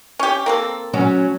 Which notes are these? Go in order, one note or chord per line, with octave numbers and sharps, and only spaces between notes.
C#4 G4
A#3 C4 A4
F#3 C#4